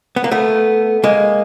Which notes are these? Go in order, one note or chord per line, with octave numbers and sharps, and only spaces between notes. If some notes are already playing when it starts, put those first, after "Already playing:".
B3
A#3
A3 B3
G#3 A#3